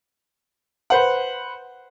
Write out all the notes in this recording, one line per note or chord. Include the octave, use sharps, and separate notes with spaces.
B4 C5 F#5